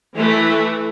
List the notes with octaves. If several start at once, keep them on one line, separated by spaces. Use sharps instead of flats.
E3 A3